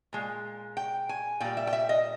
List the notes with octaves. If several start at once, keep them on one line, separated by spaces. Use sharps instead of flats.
A#2 G#3
G5
G#5
A#2 G3 G5
E5
G5
E5
D#5